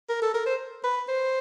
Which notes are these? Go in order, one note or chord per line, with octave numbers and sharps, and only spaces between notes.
A#4
A4
A#4
C5
B4
C5